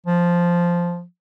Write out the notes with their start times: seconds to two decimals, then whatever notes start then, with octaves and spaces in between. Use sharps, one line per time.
0.06 F3